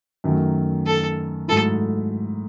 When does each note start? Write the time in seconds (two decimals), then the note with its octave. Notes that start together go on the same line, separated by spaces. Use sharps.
0.24 F#2 D#3 F#3 A3
0.86 A4
1.48 G#2 F#3 A3 E4 A4